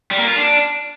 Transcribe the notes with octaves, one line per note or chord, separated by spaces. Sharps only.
G3
A#3
F4
D4